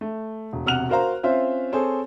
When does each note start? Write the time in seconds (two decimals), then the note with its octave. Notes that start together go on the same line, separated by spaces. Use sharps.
0.01 A3
0.53 E1
0.66 E1 C3 F#5 F6 F#6 F7
0.89 F#4 A#4 C5 F5 A#5
1.23 C4 C#4 F4 C5 E5
1.72 C4 G#4 A4 C5 C#5